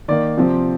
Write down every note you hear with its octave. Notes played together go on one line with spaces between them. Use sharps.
D#3 A#3 D5
C3 F3 C4